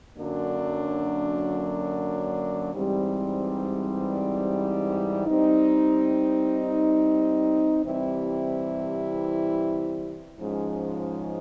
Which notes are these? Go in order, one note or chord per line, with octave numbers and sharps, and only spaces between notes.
F#2 D3 F#3 A#3 D4
G#2 E3 G3 C4
G3 C4 D#4
C3 E3 G3 C4 E4
G#2 F3 G#3 C#4